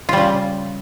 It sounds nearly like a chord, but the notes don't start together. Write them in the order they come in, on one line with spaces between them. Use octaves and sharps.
F4 G3 C#3